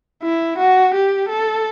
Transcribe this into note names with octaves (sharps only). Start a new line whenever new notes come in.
E4
F#4
G4
A4